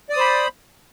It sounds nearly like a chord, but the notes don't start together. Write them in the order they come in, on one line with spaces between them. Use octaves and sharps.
D5 D#6 C5 B5